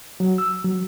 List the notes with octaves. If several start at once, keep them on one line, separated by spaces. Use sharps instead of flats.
F#3
E6
F#3